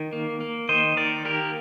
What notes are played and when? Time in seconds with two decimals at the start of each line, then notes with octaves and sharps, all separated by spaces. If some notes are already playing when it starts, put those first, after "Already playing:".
Already playing: D#3
0.13 A#3
0.41 A#3
0.69 D#3 C5 D#5
0.97 D#3 A#4 D5
1.25 A#3 G4 A#4